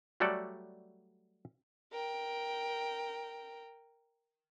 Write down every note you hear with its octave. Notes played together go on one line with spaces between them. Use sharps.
F#3 G3 A3 F#4 A4 D5
A#4 G5